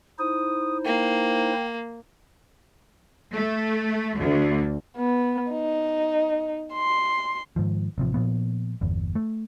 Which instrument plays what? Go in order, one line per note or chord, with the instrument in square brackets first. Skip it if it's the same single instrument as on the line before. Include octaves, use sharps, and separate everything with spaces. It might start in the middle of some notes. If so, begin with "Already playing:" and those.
[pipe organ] D#4 E4 C5 [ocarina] D#6
[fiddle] A#3 [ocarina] G5
[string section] A3
D2
[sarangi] B3
D#4
C6
[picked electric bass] G#2 D#3 F3
A1 C3 F3
A#2 F3 B3
G1 E2
A3